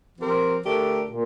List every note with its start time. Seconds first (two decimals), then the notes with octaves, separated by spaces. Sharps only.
0.19 F3 C4 G4 A#4
0.64 D3 A3 D4 G4 A#4
1.09 A#2